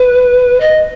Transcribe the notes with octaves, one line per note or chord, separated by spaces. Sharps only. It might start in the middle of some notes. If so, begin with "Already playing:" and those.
Already playing: B4
D#5